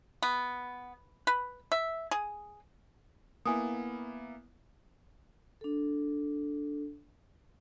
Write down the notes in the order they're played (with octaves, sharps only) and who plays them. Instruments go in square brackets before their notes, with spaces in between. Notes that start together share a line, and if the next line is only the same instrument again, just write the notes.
[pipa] B3
B4
E5
G#4
[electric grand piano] A#3 B3 E4 [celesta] G#5 D#6
[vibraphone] D4 A4